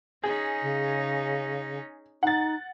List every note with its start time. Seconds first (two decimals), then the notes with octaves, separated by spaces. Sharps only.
0.23 C#4 D#4 G#4
0.62 C#3
2.23 D#4 F#5 A6